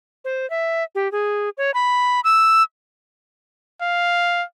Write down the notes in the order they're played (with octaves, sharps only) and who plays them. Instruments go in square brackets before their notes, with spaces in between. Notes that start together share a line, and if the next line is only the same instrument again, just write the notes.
[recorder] C5
E5
G4
G#4
C#5
B5
E6
[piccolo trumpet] F5